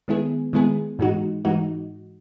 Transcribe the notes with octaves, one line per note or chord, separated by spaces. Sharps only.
D#3 G#3 B3 E4 G#4
D#3 G#3 B3 E4 G#4
G#2 E3 G#3 D#4 F#4
G#2 E3 G#3 D#4 F#4